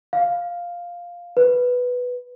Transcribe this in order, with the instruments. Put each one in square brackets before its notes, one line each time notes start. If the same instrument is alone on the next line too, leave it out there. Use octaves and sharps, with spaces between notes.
[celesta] F5
B4